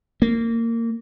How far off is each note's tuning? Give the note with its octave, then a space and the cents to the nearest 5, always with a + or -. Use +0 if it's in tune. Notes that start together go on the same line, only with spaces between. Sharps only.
A#3 -20